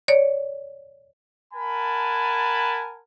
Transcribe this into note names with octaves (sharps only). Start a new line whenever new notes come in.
C#5 D5
A#4 F#5 G#5 A5 B5